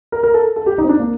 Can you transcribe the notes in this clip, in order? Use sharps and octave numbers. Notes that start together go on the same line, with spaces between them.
A#4
A#4
A4
A4
G4
D#4
C4
D4
A#3